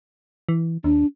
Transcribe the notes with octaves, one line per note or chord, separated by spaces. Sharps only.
E3
D#2 D4